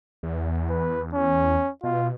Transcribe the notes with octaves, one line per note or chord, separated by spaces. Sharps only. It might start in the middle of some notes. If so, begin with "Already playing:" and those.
E2
B4
C#4
B2 F4